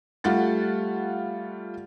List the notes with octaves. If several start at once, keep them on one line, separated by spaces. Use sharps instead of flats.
G3 A3 F4 F#5 A6